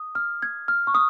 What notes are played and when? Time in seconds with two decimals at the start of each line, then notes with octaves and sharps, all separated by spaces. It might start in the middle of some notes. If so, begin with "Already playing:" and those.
Already playing: D#6
0.15 F6
0.42 G#6
0.68 F6
0.87 C#6
0.94 D#6